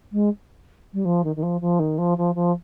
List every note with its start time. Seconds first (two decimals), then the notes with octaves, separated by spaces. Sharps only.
0.12 G#3
0.93 G3
1.05 F3
1.24 D#3
1.36 D#3
1.42 F3
1.61 F3
1.79 D#3
1.98 F3
2.17 F3
2.35 F3